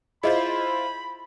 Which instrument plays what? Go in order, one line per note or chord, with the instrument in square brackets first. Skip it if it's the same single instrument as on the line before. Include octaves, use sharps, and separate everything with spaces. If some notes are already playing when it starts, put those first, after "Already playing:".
[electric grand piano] E4 F4 C5 [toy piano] G#4 D#5 F#5 [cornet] B5